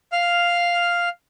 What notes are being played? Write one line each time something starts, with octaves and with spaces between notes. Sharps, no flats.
F5 F6